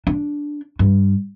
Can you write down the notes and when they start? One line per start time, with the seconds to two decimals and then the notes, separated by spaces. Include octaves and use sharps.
0.07 D4
0.79 G2